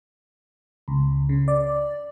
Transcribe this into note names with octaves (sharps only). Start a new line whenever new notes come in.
C#2
C#3
D5